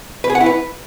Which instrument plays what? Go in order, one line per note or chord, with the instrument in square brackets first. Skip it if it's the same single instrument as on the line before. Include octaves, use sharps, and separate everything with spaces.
[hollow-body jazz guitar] B4
G#4
F#5
E4
B4